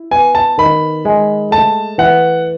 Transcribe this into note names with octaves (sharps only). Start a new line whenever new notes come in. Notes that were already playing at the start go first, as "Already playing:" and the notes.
Already playing: E4
B3 G#5
A5
D#3 B5
G#3
A3 A5
E3 F#5